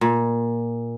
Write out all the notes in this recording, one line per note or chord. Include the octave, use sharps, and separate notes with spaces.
A#2